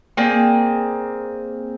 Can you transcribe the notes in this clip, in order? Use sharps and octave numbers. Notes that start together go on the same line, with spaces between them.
A#3 C4 G#4 D5